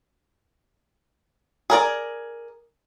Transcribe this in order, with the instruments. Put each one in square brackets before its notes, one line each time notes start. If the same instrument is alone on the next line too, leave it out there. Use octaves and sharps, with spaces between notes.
[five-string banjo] G#4 A#4 D5